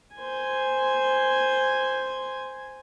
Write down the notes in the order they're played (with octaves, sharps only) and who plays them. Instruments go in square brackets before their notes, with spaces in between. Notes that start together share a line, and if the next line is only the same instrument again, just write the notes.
[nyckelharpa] C5 G#5